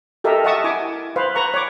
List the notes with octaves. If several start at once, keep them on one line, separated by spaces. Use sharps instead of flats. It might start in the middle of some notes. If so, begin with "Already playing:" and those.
G4 A4 A#4 D#5 E5
D#5 E5 F#5 A5 C#6 D#6
E4 G#5 D6
B4 C5 F5
B4 A#5 C#6
C#5 D6